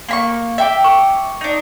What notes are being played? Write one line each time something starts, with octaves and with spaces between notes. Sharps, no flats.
A#3 B5 C#6
E5 G5 D6
C#6
D4 D#4